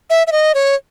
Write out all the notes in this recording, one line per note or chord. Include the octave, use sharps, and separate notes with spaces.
E5
E5
D#5
C#5